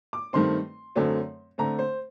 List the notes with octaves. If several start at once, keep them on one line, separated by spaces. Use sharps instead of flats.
D6
G2 D#3 A3 C4 C6
F#2 D3 F#3 A3 C4
D3 A3 C4 A#5
C5